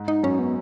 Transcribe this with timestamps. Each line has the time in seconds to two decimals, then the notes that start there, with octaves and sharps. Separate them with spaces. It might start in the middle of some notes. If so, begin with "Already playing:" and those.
Already playing: G#2
0.08 D#4
0.23 F#2 C#4
0.39 B3